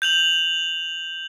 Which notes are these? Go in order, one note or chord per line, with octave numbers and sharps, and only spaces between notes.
G6 F7 F#7